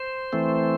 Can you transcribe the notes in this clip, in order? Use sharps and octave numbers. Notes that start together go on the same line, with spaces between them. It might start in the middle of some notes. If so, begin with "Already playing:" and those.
Already playing: C5
E3 A3 C4